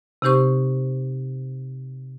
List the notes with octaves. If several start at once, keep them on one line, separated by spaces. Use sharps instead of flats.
C3 C4 D#4 G4 C5 C#6